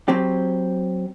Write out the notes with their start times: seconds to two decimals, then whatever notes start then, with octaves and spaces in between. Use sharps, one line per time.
0.08 F#3 C4 G4